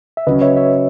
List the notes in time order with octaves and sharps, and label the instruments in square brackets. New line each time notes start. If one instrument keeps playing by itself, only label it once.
[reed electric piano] E5
[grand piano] C#3 F#3 C#4 [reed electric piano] B4 D#5
[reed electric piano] C#5 E5
C#5 E5